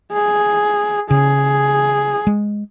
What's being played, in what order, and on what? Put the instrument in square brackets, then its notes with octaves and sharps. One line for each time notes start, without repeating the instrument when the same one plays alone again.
[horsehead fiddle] G#4
[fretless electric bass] C#3 [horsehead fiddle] G#4
[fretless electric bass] G#3